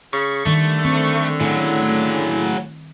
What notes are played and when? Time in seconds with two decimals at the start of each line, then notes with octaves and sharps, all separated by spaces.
0.13 C#3 C#6
0.46 D3 D#3 G3 A3
0.85 C4 C#6
1.40 A2 C#3 F#3